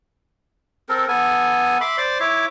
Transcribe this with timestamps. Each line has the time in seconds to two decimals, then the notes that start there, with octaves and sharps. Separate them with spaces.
0.89 C4 A4 A#4
1.08 B3 A4 G#5
1.81 E5 B5 C6 D6
1.98 C5 D5 C6 D6
2.20 E4 C#5 E5 D6